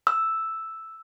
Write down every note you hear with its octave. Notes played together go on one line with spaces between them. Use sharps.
E6